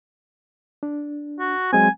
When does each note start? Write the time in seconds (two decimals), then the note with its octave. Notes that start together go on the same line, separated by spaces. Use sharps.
0.83 D4
1.39 F#4
1.73 F#3 G#3 C4 G#5